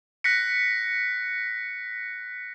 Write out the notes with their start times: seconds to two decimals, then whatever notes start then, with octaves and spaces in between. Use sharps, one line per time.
0.24 F#6 A#6 B6 C#7